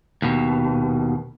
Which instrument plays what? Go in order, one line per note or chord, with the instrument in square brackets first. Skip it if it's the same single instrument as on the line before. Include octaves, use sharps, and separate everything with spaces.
[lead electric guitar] D#2 B2